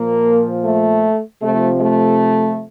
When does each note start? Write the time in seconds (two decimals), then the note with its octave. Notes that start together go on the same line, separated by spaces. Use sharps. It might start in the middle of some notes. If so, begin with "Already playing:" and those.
Already playing: A#2 F3 A#3
0.65 A3
1.42 C3 F3 A3
1.82 A3